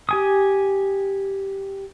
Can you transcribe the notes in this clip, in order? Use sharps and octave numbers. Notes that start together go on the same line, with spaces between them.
G4 G#5 D#6